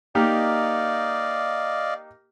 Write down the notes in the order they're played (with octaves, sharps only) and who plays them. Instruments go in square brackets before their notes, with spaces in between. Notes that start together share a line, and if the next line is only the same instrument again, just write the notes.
[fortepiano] A#3 D#4 G4 [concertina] D5 D#5 F5